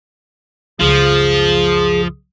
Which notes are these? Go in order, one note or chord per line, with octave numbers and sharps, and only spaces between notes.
C#2 F#2 F3 G#4